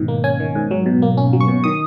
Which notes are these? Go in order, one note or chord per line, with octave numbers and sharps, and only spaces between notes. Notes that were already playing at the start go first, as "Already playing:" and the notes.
Already playing: G#2 B2 D#3
A#3
C#4 G#5
D#3
G#2
F#3
B2
A#3
C#4
F#3
C#6
B2
D#3 D#6